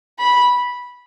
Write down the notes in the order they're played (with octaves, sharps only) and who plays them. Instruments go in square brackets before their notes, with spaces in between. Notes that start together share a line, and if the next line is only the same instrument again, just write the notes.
[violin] B5